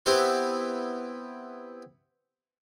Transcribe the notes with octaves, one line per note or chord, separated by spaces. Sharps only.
B3 C4 E4 G4 B4 C5